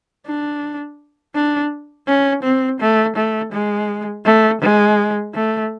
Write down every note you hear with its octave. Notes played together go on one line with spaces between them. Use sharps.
D4
D4
C#4
C4
A3
A3
G#3
A3
G#3
A3